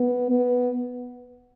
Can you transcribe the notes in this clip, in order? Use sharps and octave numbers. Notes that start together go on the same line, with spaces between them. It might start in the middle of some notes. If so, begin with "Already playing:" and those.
Already playing: B3
B3